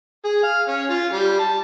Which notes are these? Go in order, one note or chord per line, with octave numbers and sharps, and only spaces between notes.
G#4
F5
C#4
F4
G3
A5